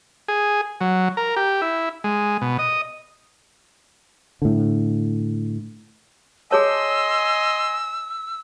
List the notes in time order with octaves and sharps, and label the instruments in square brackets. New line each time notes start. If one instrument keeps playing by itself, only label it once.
[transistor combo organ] G#4
F#3
A#4
G4
E4
G#3
B2
D#5
[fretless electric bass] A2 D3
[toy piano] G#4 C#5 A5 [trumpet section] D#5 G#5 C6 [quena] E6